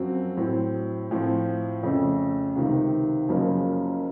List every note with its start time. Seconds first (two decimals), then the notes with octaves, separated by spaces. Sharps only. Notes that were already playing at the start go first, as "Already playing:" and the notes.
Already playing: F#2 F3 C4 F#4
0.37 A2 F#3 C4
1.11 A2 F3 C4
1.83 F2 C#3 A3
2.56 C#2 C3 D#3
3.29 F#1 F#2 C#3 F3 A#3